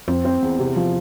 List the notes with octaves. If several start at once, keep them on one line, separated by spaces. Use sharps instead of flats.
F2 C4
C4
E2
C3
F3